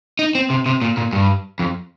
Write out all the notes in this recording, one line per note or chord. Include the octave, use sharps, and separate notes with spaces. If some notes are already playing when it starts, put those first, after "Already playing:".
D#4
C4
C3
C3
A#2
A#2
G2
F2